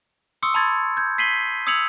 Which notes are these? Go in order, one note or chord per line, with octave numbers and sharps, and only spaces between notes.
C6 C#6 D#6 E6 C#7
A5 B5 C6 G#6 A6
G6 G#6
B6 C7 D#7 F#7 G7
D#6 E6 G#6 C#7 F7 F#7